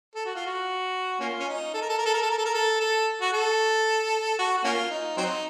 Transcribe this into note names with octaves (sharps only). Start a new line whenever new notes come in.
A4
F#4
F4
F#4
A#3 C#4 F4
C#4
D#4
A4
A#4
A4
A#4
A4
A#4
A4
A#4
A4
A#4
A4
A4
F#4
A4
F#4
F#4
A#3 C#4 F4
D#4
F#3 C4 D#4